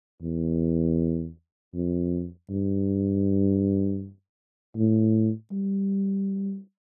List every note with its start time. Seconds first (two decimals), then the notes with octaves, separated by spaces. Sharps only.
0.22 E2
1.74 F2
2.49 G2
4.77 A2
5.51 G3